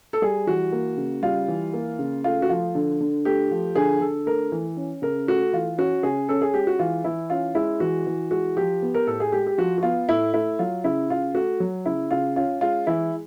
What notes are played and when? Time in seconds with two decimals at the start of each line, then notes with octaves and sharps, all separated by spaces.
0.13 A4
0.22 G3 G#4
0.47 E3 F#4
0.72 A#3
0.97 C#3
1.23 G3 F4
1.48 E3
1.73 A#3
1.99 C#3
2.24 A3 F4
2.42 F#4
2.49 F3 F4
2.75 D3
3.00 D3
3.25 A3 G4
3.51 F3
3.75 D3 G#4
4.01 D3 A4
4.26 A3 A#4
4.52 E3
4.77 C#4
5.02 C#3 A#4
5.27 A3 F#4
5.53 E3 F4
5.78 C#4 F#4
6.03 C#3 G#4
6.29 C#4 A4
6.41 G#4
6.54 G#3 G4
6.67 F#4
6.79 E3 F4
7.04 E3 E4
7.30 C#4 F4
7.55 G#3 E4
7.80 E3 F#4
8.07 E3
8.31 G#3 F#4
8.57 F3 G4
8.82 B3
8.95 A#4
9.07 A2 A4
9.20 G#4
9.32 G#3 G4
9.47 G4
9.58 F3 F#4
9.78 F#4
9.83 B3 F4
10.08 A2 E4
10.34 A3 E4
10.59 F#3 F4
10.84 C#3 E4
11.10 C#3 F4
11.34 A3 F#4
11.60 F#3
11.86 C#3 E4
12.11 C#3 F4
12.36 C#4 F4
12.61 G#3 F4
12.87 E3 E4